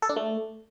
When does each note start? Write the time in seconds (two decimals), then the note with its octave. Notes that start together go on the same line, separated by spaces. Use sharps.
0.02 A4
0.09 D4
0.16 A3